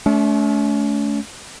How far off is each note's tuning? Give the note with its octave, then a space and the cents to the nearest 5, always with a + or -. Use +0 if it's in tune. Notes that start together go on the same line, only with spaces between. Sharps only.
A3 -30 C#4 +40